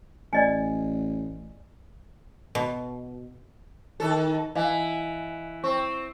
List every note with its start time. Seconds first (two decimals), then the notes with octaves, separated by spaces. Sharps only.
0.33 A1 D5 D#5 G#5
2.55 B2
4.00 D#3 A4
4.55 E3 D#5 F5 G#5
5.64 C4 C#6